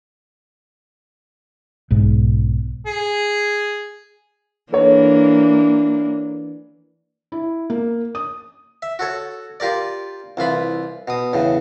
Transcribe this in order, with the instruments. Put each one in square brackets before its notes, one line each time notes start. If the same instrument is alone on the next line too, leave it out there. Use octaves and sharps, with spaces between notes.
[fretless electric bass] B1 G#2
[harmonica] G#4
[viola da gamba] E3 A#3 D4 [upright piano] A4 B4 C#5
[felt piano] E4
A#3
D#6
[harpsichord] E5
F#4 A4 C#5
F4 G4 A#4 D5
C2 E3 F4 B5
B2 D#6
E2 A2 C#3